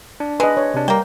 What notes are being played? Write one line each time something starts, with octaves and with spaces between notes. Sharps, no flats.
D4
G#3 B4 D#5
C#5
C3 D4
G3 A#3 G5